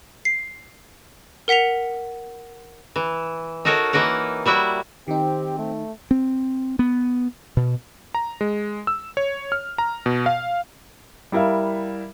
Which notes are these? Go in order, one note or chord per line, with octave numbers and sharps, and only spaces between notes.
C7
A#4 F#5 B6 C#7 F7
E3
D#4 F#4 A4 A#4 C#5
E3 A#3 D#4 A#4 F#5
G3 E4 F#4 E5
D#3 C4 D#4 G4
A3
C4
B3
B2
A#5
G#3
E6
C#5
F6
A#5
B2
F5
G3 E4 A#4 E5 F5